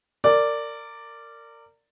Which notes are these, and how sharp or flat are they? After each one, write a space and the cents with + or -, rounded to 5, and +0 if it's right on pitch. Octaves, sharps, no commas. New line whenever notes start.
A#4 -25 D5 +0